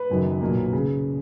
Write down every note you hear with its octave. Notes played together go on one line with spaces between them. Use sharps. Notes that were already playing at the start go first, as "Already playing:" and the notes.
Already playing: B4
F#1 F#2 D#3 F#3
B1 A#2 F#3 A#3
C#3